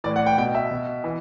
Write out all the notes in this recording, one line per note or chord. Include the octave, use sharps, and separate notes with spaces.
A2 E3 D5
F#5
G5
B2 G5
E5
B2
E3